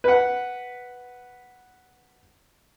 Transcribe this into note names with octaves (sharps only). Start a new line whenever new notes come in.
B4 F#5